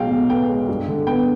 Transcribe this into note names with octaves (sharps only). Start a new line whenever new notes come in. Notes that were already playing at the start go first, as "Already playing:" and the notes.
Already playing: B1 B2 G#3 F5 G5
B2
B3 G5
G#3
G2
D3
B3 G5